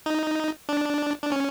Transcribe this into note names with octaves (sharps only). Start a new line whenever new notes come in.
D#4
D4
D4
C#4